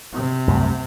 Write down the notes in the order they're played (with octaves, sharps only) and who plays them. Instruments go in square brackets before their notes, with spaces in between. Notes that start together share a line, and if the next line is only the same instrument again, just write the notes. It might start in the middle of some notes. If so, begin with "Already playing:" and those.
[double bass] C3
[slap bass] C2 F#2 A3